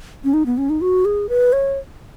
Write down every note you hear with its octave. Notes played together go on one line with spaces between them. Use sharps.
C#4
D#4
B3
C#4
D#4
F#4
G#4
B4
C#5